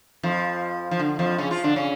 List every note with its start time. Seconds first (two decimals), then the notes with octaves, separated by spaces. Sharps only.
0.23 F2 F3
0.91 F3
0.99 D3
1.19 F2 F3
1.38 C#3 C#4
1.50 F3 F4
1.64 D3 D4
1.76 C#3 C#4